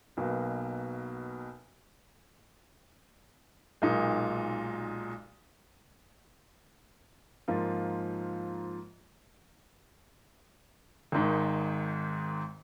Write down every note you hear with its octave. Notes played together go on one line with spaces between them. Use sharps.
B1 B2 A#3
B1 A#2 G#3 D#4
G#2 F3 A#3 F4
G#1 G#2 D#3